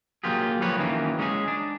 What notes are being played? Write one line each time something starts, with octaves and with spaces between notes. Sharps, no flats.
F#3 A#3 F4 G4 G#4
F3 G3 A#3 B4 C#5
F#2 D#3 E3 A#3 C#4
G#3 C#4 D#4 E4 G#4
D4